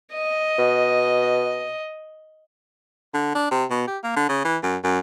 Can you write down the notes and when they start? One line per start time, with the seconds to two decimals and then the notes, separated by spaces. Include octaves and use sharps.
0.13 D#5
0.58 B2
3.14 D3
3.35 D4
3.51 C3
3.70 B2
3.87 G4
4.03 A#3
4.16 D3
4.29 C#3
4.44 E3
4.63 F#2
4.84 F#2